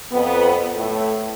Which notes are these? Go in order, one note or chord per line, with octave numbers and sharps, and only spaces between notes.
F2 B3
A2 A3